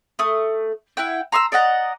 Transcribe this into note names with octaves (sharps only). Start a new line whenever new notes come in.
A3 D#6
E4 F#5 G5
A#5 C6 D#6 E6
D5 D#5 F#5 A#5